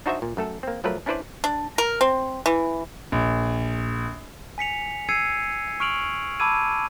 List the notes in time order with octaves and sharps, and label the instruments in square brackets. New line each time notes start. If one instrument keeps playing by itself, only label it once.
[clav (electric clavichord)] D4 D#4 F#4 C5 D#5 E5
A#2
F#2 A3 A4
A#3 C4
F3 F#3 A3 A#4 B4
C#4 D4 E4 B4 C5 D5
[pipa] D4
A#4
C4
E3
[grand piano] A#1
[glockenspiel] G#5 B6 C#7 F7
E6 G#6 C7 C#7 D#7
C#6 F6 D7 F7 F#7
A5 B5 D6 E6 G#6 D#7